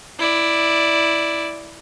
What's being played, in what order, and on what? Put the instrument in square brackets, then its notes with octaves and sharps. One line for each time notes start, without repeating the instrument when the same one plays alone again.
[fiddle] E4 D5